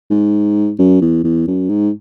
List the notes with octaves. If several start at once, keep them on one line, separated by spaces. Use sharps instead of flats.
G#2
F#2
E2
E2
F#2
G#2